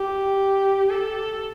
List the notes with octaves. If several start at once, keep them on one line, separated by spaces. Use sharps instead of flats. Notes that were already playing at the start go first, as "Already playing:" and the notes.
Already playing: G4
A4